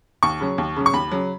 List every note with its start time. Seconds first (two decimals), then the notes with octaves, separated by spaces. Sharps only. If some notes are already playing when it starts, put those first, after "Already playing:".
0.23 D#2 C#6
0.41 C#3 F#3
0.58 D#2
0.77 C#3 F#3
0.86 C#6
0.93 D#2 B5
1.12 C#3 F#3